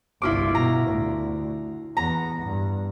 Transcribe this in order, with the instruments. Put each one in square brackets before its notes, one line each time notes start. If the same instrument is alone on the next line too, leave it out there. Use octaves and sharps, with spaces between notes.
[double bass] G1 C2 [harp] E4 F4 D6
[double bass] B2 [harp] A#5
[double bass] D2
[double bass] E2 B3 [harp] A#5
[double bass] G2